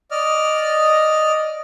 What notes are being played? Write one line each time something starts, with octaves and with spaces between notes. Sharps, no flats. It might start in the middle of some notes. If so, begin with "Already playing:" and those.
D5 D#5 F6